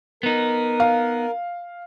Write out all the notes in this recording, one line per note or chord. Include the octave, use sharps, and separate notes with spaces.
B3 D#4 A#4
F5